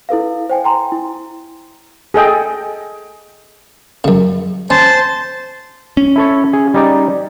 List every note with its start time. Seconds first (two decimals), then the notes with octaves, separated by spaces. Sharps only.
0.09 E4 A4 B4 F5
0.49 C5 G5 G#5
0.64 G5 G#5 A#5 C6
0.92 E4
2.14 G#4 A4 D#5 G5
4.04 F#2 C#3
4.70 C#4 C5 A5
5.97 C#4
6.16 E4 A4 C#5
6.53 G#4
6.74 G3 D#4 D5